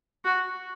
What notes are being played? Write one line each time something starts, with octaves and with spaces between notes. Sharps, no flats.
F#4